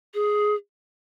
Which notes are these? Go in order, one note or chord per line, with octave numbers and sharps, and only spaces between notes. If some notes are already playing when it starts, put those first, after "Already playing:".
G#4